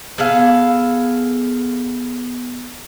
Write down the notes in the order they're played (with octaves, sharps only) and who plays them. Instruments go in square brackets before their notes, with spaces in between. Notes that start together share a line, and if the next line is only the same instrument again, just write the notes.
[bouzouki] B3 G#4 A4 F5